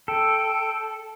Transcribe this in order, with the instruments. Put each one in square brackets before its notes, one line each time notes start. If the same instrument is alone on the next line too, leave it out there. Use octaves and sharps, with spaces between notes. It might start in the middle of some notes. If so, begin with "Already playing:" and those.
[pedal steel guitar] A4 [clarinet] G5